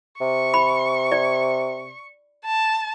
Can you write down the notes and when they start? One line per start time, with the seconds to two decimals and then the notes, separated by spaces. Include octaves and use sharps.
0.21 C3 C#6
0.54 B5
1.12 D5
2.46 A5